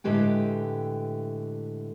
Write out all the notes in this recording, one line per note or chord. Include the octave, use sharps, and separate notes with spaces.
A2 D3 G#3 G4 B4 G5